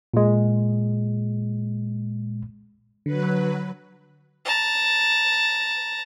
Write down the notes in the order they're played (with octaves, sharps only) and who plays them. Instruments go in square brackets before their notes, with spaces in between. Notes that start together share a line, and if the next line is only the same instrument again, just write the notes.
[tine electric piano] A#2 G#3
[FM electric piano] D3 [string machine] F#3 B4
[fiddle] A5 A#5